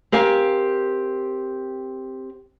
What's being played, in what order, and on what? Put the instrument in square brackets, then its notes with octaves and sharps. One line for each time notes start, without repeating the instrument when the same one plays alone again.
[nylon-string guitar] C4 G4 A#4 F5 G#5